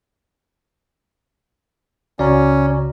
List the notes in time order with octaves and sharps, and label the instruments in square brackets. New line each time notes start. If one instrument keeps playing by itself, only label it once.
[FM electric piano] C#2 C#3 F#4 [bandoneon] C#4 [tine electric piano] D5 A#5